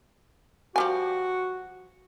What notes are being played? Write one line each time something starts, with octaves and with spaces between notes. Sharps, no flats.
F3 G3 F#4 G#5